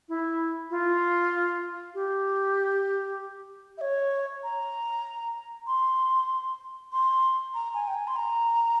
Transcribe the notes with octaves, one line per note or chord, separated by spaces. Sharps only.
E4
F4
G4
E5
C#5
A#5
C6
C6
A#5
G#5
G5
G#5
C6
A#5